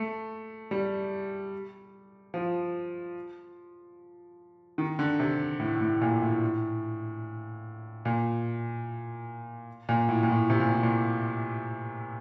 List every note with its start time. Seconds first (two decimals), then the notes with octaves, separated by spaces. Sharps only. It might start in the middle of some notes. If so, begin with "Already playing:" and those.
Already playing: A3
0.71 G3
2.34 F3
4.78 D#3
4.99 D3
5.20 C3
5.60 A2
5.81 A2
6.02 A#2
6.22 A2
8.05 A#2
9.89 A#2
10.09 A2
10.23 A#2
10.29 A2
10.50 C3
10.60 A#2
10.72 A2
10.83 A#2